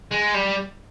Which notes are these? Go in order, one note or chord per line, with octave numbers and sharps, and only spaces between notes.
G#3
G3